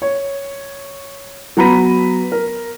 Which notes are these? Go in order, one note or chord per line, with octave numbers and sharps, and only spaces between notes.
C#5
F#3 B3 A#5 B5 B6 D#7
A#4